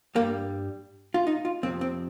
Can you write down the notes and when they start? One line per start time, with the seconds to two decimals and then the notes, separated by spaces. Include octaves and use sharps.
0.15 G2 G3 A#3
1.14 F4
1.27 D#4
1.45 F4
1.63 F2 C3 F3 C4
1.81 C4